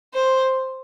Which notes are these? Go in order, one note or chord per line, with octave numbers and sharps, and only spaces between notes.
C5